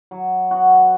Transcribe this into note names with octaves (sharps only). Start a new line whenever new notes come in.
F#3
B3 F#4